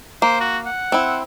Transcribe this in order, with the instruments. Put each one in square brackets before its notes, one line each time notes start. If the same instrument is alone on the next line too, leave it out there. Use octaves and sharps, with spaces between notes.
[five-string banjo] A#3 [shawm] C5
[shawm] F#4
F#5
[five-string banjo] C4 E4